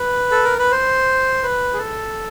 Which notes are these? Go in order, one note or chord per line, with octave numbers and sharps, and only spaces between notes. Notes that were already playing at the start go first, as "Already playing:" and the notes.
Already playing: B4
A4
A#4
B4
C5
B4
G#4
A4